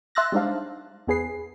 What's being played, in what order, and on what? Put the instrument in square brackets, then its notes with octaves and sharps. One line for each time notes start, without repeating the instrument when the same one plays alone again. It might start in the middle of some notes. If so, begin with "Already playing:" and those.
[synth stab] E5 C6 E6 F#6 A6 A#6
G3 G#3 D4 D#4 C5 F5
E2 B3 G#4 B4 C7